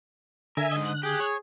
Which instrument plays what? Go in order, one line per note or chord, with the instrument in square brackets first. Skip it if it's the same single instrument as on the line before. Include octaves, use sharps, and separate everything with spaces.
[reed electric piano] D3 [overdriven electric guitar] A#4 [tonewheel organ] E5 G#5
[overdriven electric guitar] G#2 D#5
[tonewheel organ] F#6
[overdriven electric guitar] G4 [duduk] G#4
[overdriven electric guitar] C#5